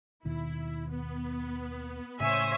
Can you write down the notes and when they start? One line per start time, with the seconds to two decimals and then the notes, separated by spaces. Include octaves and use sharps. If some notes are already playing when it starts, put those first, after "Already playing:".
0.25 D#2 B2 D#3 E4
0.90 B3
2.20 A2 C#3 C5 C#5 E5 G#5